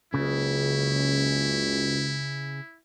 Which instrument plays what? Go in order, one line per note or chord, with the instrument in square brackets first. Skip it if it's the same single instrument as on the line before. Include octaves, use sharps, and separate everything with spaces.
[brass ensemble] F#1 C#2 [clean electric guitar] C#3 [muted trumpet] E4